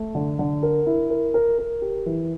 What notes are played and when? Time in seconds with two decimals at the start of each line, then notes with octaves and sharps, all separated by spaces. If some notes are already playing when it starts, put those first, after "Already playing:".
Already playing: A3
0.15 D3
0.39 D3
0.63 A#4
0.87 E4
1.10 A#4
1.34 A#4
1.59 A#4
1.82 G4
2.06 E3